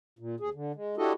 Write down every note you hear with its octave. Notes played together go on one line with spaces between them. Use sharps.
A#2
D#2 G#4
D3
G#3
D4 E4 F#4 G4 A4 D#5